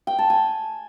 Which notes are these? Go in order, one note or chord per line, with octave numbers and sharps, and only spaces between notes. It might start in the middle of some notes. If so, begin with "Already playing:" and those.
G5
A5
G#5